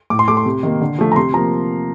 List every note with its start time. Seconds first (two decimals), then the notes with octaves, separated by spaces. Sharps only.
0.10 A2 D6
0.19 C6
0.28 A3 D6
0.37 C6
0.45 C3
0.63 D#3 A#3
0.81 D3
0.98 F3 A3
1.12 A#5
1.16 C3 C6
1.34 F3 A#3 A#5